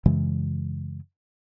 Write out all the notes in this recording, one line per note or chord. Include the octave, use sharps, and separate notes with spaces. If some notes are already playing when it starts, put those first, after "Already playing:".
F#2 C#3 E3 G#3